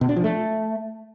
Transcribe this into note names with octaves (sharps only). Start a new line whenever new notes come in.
B2
D4
F3
A3